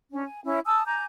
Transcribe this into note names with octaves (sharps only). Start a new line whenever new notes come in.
C#4 D4
G#5
C#4 E4
G#5 A5 D#6 E6
G#5 A#5 D6 G6